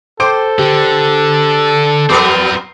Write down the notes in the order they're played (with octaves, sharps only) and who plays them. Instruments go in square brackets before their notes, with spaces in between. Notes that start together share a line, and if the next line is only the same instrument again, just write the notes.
[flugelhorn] A4 [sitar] C5 [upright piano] G5 D6 D7
[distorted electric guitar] D3 [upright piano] G4
[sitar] F#3 B3 A#4 [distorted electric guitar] C4 F4 [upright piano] D6 C7